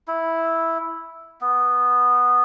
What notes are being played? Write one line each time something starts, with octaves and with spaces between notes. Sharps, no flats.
E4
B3